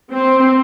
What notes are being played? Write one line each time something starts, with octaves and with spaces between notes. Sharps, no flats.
C4